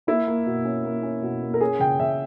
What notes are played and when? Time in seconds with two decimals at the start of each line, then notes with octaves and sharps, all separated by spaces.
0.07 A#3 E4
0.27 A#3
0.46 B2
0.65 C#4
0.85 A#3
1.03 C#4
1.22 B2
1.42 A#3
1.54 A#4
1.61 C#4 G#4
1.79 C#3 G5
1.99 C#3 E5